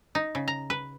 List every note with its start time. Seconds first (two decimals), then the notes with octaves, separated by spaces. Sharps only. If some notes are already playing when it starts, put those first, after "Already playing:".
0.15 D#4
0.35 C#3
0.48 A#5
0.70 B4